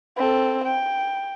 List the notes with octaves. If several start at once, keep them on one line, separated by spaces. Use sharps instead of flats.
C4 A4
G5